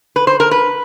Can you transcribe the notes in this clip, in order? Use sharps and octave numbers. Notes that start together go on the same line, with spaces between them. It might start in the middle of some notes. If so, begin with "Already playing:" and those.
B4
C5
A#4
B4